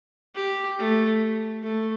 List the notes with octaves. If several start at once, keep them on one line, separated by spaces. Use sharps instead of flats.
G4
A3
A3